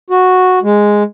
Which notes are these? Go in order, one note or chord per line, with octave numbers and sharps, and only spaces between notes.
F#4
G#3